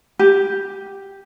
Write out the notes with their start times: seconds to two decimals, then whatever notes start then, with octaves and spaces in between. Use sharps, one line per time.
0.19 G4